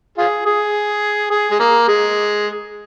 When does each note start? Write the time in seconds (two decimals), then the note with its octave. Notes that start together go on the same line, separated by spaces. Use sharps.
0.18 F4 G#4
0.46 G#4
1.31 G#4
1.51 G#3
1.60 A#3
1.88 G#3